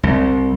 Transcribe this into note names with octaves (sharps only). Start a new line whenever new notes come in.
C2